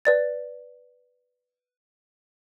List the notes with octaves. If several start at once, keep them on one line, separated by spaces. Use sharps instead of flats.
B4 D5 A6